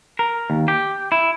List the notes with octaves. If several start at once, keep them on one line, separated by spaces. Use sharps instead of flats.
A#4
D#2
G4
E4